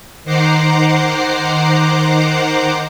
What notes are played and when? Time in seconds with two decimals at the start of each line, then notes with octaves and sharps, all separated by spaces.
0.24 D#3 C5 F#5 A#5 D6 C7